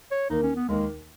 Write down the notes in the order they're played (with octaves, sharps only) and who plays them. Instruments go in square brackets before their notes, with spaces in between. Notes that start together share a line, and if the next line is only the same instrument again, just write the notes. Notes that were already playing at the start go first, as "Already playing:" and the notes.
[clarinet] C#5
[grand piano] D#2 D#3 A#3 [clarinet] D#4
[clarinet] C#4
B3
[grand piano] D#2 D#3 A#3 [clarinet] G#3